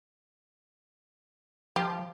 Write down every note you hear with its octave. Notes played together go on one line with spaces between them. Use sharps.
F3 G4